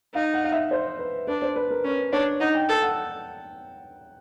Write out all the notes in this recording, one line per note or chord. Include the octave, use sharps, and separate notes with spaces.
D#4 F5
F#5
F5
E5
C5
B4
D4 B4
C5
B4
A#4
C#4 B4
D4 C#5
D#4 F#5
G5
A4
F#5